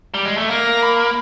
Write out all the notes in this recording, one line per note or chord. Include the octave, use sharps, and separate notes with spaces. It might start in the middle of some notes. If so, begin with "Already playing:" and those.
G3
G#3
A3
A#3 A#5
B5